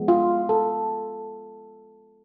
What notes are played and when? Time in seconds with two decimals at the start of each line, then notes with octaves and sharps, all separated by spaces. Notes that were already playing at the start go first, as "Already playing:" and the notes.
Already playing: F3 G#3 B3
0.08 F4
0.49 A4